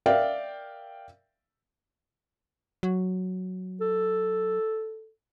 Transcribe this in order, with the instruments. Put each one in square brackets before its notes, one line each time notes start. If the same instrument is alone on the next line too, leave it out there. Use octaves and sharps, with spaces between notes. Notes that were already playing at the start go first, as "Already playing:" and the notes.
[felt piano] A#4 D5 E5 F5 G5
[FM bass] F#3
[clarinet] A4